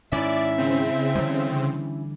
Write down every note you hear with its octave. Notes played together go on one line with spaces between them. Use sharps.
G#2 D#3 C#4 E4 D5 E5
C#3 C4
D3 E3 G3